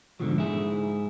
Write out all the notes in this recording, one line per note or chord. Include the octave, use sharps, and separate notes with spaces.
G#2 B2 D3 D#3 F3 F#3
G#2 E4 G#4